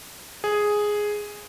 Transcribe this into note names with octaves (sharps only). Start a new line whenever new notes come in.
G#4